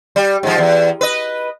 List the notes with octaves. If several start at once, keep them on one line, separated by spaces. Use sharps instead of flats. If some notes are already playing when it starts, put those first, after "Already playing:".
G3
G#2 F3
E2
B4 D#5